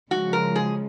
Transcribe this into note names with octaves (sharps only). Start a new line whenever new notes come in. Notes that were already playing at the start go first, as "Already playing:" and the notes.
C#3 F3 G#3 F#4
A#4
G#4